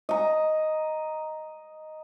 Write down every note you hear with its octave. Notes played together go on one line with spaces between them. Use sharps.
D#5 A#5